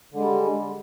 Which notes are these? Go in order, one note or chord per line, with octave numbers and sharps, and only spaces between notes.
D3 G3 G#3